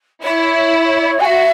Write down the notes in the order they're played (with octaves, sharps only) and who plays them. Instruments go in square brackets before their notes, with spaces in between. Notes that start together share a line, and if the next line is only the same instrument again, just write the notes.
[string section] E4 [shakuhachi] C#5
[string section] F#4 [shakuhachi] G#5
[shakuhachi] E5